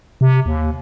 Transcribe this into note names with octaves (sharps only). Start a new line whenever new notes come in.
C3
D#2